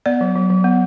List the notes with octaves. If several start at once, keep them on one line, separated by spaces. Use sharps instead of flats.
B3 D5
F#3
F#3
F#3
B3